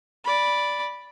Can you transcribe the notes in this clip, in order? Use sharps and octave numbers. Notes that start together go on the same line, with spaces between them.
D5 B5